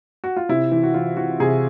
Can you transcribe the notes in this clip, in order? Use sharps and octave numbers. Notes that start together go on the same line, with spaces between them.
F#4
F4
C3 E4
E3
F#4
E3 F4
E3 F#4
C3 G#4